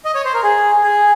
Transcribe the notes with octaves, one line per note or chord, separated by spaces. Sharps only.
D#5
C#5
C5
A#4
G#4
G#4